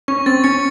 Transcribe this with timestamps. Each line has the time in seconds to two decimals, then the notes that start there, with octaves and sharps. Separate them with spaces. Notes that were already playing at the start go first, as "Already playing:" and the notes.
0.08 C#4 C#6
0.26 C4 A6
0.44 C#4 C#7